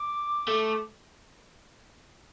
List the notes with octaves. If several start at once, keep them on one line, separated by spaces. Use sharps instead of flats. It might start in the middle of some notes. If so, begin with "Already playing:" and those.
Already playing: D6
A3